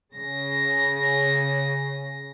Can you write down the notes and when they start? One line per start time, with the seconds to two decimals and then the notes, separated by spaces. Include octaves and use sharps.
0.14 C#3 A#6